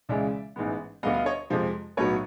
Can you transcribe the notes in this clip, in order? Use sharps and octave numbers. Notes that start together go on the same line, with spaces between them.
C#2 C#3 E3 G#3 D5 E5
A1 G#2 E3 G#3 B3
D2 D3 G3 B3 D#5 F5
D#5 F5
C#5 D#5
F2 C3 F3 G#3
B1 A2 F#3 B3 B4 C#5